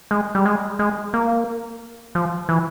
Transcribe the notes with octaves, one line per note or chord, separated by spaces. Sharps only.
G#3
G3
G#3
G#3
A#3
F3
E3